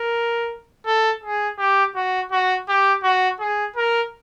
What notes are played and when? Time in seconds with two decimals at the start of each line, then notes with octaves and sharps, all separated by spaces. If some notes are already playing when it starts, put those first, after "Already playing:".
Already playing: A#4
0.86 A4
1.23 G#4
1.58 G4
1.96 F#4
2.32 F#4
2.68 G4
3.03 F#4
3.40 G#4
3.76 A#4